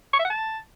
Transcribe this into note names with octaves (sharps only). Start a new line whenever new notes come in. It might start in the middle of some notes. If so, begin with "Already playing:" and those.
C#6
E5
F#5
A5